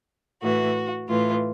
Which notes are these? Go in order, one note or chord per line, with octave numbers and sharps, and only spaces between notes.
A2 E3 F#4
A2 E3 F4